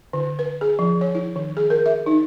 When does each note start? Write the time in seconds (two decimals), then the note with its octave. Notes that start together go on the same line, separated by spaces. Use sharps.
0.13 D3
0.39 B4
0.61 G#4
0.79 F3
1.01 C#5
1.15 E4
1.36 D#3
1.57 G#4
1.70 A#4
1.86 E5
2.06 D#4